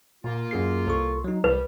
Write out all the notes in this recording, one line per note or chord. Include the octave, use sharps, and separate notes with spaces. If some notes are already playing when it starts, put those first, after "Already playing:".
A#2 A#3 F4
F#2 G#4 C7
C2 A4 C#6
F#3 D#4
C2 G3 B4